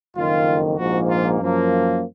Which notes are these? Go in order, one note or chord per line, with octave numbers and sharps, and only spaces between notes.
F#1 F2 D#3 F4
A#1 G#2 F3 A#3 F#4
F4
F#2 F3 A#3